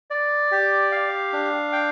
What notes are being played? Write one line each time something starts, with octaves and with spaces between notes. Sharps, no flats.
D5
G4
F5
D4
G5